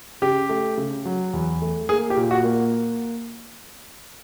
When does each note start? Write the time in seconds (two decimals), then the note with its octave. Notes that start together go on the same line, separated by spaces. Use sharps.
0.22 C#3 G4
0.49 A3
0.78 C#3
1.05 F#3
1.33 E2
1.62 A3
1.89 A#3 G#4
2.10 G4
2.16 A#2
2.31 F#4
2.44 A#3